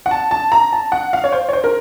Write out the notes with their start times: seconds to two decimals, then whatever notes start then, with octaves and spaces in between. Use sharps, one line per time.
0.06 F#5
0.11 A5
0.31 A5
0.52 A#5
0.73 A5
0.92 F#5
1.13 F5
1.24 C#5
1.32 C5
1.49 C#5
1.53 C5
1.64 A#4